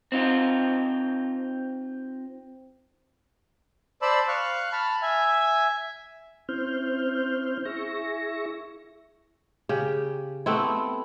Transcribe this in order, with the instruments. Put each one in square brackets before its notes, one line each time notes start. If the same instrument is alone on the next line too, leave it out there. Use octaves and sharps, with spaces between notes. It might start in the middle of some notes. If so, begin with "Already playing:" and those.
[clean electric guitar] C4 D#4 F4
[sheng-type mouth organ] C5 D5 A5 B5 E6
F5 C#6 F#6
A5 B5 F6
E5 G#5
[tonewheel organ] C4 C#4 E4 C5 F6 G6
E4 G#4 E5 C#6 A#6
[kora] C#3 G4
A3 B3 C4 E4